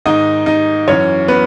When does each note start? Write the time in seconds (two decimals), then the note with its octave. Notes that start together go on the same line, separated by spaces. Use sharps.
0.06 G#2 D#3 D#4 D#5
0.46 D#4 D#5
0.88 F#2 E3 C#4 C#5
1.28 B3 B4